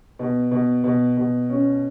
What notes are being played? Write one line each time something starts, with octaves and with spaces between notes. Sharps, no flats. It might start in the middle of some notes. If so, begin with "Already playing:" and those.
B2
B2
B2
B2
C#4